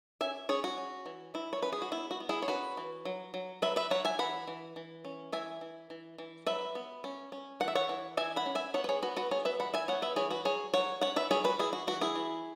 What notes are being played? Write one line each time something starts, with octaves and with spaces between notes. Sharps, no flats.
C#4 E5 G#5
C#4 G#4 C#5
F#4
C#4
E3
E3 E4
C#5
C#4 B4
G#4
F#4
B3 E4
F#4
B3
E4 G#4
C#5
C#4 F#4 B4
E3
F#3
F#3
F#3 B4 E5
B4 E5
F#3 C#5 F#5
E5 G#5
E3 F#5 B5
E3
E3
C#4
E3 E5 G#5
E3
E3
E3
F#3 B4 E5
B3
C#4
C#4
E3 F#5
E5
C#5 F#5
E3
E3 E5 G#5
F#5 B5
C#4
E5 G#5
B3 C#5 F#5
B4
G#4 C#5
B3 F#4 B4
F#4 B4
B3 G#4 C#5
B4 E5
E3 F#5 B5
E5 G#5
B3 C#5 F#5
B4 E5
E3 G#4 C#5
F#4 B4
F#3 G#4 C#5
F#3 C#5 F#5
C#4 C#5 F#5
B4 E5
F#3 G#4 C#5
F#4 B4
E3 E4 G#4
F#4
E3 F#4
E4 G#4
E3